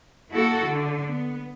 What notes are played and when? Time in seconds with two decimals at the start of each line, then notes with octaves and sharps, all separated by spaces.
0.31 A#3 E4 F#4 A4
0.65 D3
1.07 B3